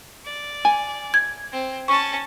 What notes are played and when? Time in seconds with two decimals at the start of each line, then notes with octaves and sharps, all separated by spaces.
0.25 D5
0.65 G#5
1.14 G#6
1.52 C4
1.88 C#4 A5 C#6